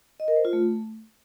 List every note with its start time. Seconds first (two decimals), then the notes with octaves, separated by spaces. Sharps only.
0.20 D#5
0.28 A#4
0.36 C5
0.45 F4
0.53 A3